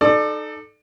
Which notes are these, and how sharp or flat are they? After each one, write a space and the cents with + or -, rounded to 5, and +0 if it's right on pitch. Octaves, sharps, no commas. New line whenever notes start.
D#4 -20 A4 -15 D5 +25